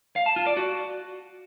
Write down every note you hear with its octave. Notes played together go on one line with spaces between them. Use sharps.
F5
A5
F4
D5
F#4